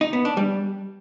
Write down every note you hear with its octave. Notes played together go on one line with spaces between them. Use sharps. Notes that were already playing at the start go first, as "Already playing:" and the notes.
D#4
B3
D4
G3